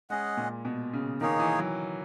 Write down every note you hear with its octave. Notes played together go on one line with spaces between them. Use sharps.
G#3 C#4 G#4 D#5 F#5
A#2
B2
C#3
D#3 A#3 D#4 G#4 C#5
E3
F#3